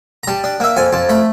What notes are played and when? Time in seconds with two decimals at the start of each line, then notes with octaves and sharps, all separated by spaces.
0.23 A#5
0.28 G3 A5
0.44 D4
0.60 A#3 E5
0.77 F2 G#5
0.93 F2 A5
1.09 A3 B5